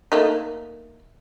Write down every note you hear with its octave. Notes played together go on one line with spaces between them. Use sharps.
A3 A#3 D#4